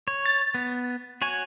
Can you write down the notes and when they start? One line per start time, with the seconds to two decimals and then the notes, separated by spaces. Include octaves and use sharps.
0.08 C#5
0.26 A6
0.54 B3
1.22 F#4 C#5 G#5